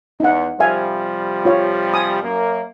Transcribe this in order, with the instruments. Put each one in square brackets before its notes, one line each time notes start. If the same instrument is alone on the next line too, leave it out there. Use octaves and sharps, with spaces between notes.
[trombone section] E2 [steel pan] D#4 F#5
[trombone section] C3 F3 G3 [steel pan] E5 F5 G#5
[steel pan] F4 C#5 F5
G#5 D#6
[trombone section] F#2 A#3